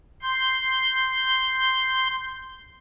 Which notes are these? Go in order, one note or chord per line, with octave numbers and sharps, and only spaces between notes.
C6 G6